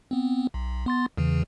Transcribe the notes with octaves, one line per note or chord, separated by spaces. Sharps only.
B3 C4
B1
B3 C6 A6
E2 C#3 E3